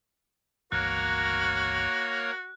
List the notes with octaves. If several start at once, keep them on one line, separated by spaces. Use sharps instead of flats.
G1 C#2 E3 A#3 F#4 A#4 C#5 F#6